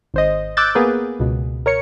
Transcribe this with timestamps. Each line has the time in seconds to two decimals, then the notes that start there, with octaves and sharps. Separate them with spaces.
0.14 G#1 C5 D#5
0.57 D6 E6 F#6 G6 A6
0.75 A#3 B3 G#4 A#4 B4
1.19 C#2 B2
1.66 A#4 C#5 C#7